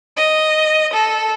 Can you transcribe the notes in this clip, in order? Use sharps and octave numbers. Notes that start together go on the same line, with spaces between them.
D#5
A4